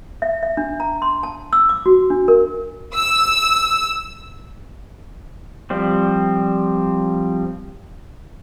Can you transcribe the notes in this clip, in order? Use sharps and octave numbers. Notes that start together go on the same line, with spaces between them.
E5
E5
D4
A#5
C6
A5
E6
D6
F#4
D4
A#4
E6
F3 G3 C4